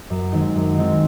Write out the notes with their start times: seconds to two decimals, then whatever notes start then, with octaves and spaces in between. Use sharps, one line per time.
0.10 F#2
0.32 D#3 G#3 C4 D#4
0.55 F#2
0.77 D#3 G#3 C4 D#4